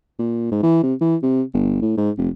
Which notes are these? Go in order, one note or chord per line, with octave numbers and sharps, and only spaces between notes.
A#2
G#2
E3
C3
E3
C3
G1
A2
G#2
F1